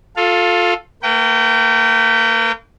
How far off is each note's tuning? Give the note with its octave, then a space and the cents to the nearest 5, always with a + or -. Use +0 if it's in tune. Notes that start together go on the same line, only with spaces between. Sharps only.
F4 +25 A4 +0 F5 +0
A#3 -35 B4 +0 G5 -30